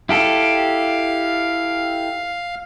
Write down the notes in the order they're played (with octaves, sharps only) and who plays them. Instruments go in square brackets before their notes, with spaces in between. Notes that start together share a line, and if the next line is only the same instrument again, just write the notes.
[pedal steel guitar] E4 G4 A4 [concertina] F5